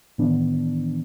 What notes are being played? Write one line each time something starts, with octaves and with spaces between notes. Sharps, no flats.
A2 D#3 E3 B3 D4